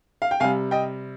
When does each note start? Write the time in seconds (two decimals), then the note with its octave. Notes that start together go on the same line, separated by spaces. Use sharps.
0.22 F5
0.31 G5
0.40 C3 G3 F5 G#5
0.71 D#5 G5